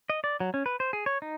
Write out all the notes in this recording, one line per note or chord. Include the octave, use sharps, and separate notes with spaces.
D#5
D5
F#3
C#4
B4
C5
G#4
C#5
D#4